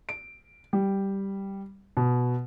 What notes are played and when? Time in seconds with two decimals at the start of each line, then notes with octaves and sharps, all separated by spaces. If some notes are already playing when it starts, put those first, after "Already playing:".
0.09 D7
0.73 G3
1.97 B2